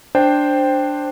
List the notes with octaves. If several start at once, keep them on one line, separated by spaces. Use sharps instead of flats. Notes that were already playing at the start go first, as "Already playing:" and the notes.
D4 C5 G5